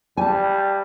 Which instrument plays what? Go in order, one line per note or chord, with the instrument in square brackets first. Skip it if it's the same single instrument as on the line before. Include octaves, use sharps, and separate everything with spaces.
[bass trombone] G3 [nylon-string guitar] G#5 A5